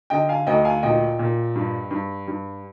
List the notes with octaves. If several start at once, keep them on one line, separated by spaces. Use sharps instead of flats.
D3 D#5 G5
F5 G#5
D2 D#5 G5
F5 G#5
A#2 D#5 G5
A#2
G2
G2
G2